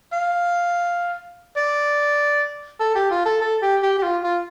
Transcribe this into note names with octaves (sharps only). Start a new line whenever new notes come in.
F5
D5
A4
G4
F4
A4
A4
G4
G4
G4
F4
F4